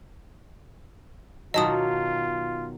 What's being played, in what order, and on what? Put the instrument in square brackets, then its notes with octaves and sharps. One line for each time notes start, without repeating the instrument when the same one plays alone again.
[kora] B2 D#3 F#3 [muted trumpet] F4 [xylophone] D#5 A5 D#6